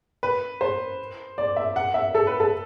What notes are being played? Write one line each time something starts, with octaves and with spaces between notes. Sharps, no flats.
B4
C5
D5
E5
F#5
E5
A4
B4
A4